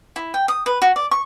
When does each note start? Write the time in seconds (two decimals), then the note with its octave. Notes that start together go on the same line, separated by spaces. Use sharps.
0.16 E4
0.34 G5
0.48 D#6
0.66 B4
0.82 F#4
0.96 D5
1.11 C#6